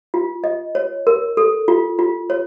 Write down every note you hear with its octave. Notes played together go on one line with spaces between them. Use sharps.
F4
D#5
C#5
A#4
A4
F4
F4
C#5